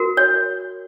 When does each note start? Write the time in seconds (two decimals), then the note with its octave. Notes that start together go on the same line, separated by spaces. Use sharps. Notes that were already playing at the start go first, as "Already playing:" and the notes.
Already playing: F#4 A#4
0.17 C#5